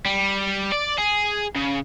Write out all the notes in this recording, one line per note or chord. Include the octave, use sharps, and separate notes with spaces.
G3
D5
G#4
C#3